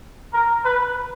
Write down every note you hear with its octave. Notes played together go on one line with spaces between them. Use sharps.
A#4
B4